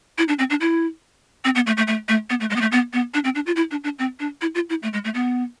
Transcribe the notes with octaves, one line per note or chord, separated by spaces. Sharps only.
E4
D4
C4
D4
E4
C4
B3
A3
A3
A3
A3
B3
A3
G#3
B3
A3
B3
B3
D4
C4
D4
F4
E4
D4
D4
C4
D4
E4
F4
E4
A3
G#3
A3
B3